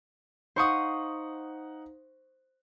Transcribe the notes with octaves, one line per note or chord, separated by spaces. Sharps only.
D#4 C5 F5 F#5 C#6 D#6